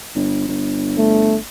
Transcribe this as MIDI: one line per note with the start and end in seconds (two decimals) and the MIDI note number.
0.15 0.46 31
0.48 1.39 31
0.98 1.37 57